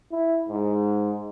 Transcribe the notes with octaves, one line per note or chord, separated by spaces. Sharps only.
E4
G#2